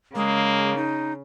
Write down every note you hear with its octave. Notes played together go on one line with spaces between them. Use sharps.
C#3 G#3 A#3
D#4